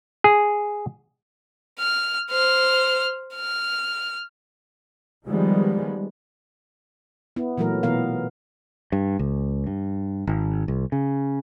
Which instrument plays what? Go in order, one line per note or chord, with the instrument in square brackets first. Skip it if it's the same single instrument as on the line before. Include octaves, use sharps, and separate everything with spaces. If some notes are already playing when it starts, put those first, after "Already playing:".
[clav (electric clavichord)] G#4
[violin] F6
C5 F6
F6
[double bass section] D#3 F3 G3 G#3 B3
[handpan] B3 E4
A#2 E3 F#3 A3 A#4
B2 E3 B3 A#4 F5
[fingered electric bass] G2
C#2
G2
G#1
C2
C#3